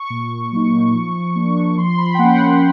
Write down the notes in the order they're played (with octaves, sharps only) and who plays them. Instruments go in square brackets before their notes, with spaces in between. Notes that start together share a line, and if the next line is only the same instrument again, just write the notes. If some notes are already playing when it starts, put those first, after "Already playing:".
Already playing: [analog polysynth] C#6
A#2
F#3 A#3 D#4
F3
A#3 D4
F3 C6
B5
G5
A#3 C#4 F#5